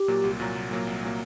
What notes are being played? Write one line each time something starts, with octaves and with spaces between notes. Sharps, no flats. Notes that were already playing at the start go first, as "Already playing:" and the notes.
Already playing: G4
A#2 F#3 A#3
C2
A#2 F#3 A#3
C2
A#2 F#3 A#3
C2
A#2 F#3 A#3